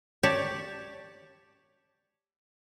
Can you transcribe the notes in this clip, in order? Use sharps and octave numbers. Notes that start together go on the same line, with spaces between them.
G4 C#5 D5 A5